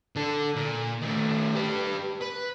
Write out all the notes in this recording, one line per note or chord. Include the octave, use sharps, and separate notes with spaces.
D3 A4
A#2
D#3 A3
G4 B4
B4